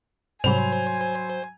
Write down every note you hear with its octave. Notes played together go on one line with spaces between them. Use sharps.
G#2 C3 F#3 G3 C5 G#5 B5 F7